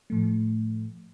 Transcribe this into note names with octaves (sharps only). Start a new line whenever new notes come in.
A2 F3 A3